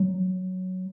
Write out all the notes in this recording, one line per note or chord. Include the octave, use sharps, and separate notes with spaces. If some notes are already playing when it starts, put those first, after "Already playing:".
Already playing: F#3